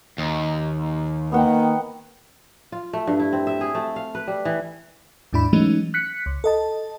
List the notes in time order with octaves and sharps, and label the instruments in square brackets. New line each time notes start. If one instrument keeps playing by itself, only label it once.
[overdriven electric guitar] D#2
[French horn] D#3 [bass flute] A#3 [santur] B3 F#5 G5
[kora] F4
A3
G2
E4
C4
E5
G#4
A3
F5
B4
G3
E3
[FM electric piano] D#2 G#2 D4 E4 B5
E3 F#3 G#3 A3 C#4 D#4
F#6 B6 C#7
C#2
A4 D#5 A5